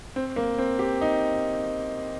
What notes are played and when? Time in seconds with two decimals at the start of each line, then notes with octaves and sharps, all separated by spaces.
0.16 C4
0.36 A#3
0.58 C4
0.79 G4
1.01 D#4